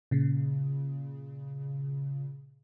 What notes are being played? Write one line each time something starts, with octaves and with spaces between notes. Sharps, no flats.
A#2 C#3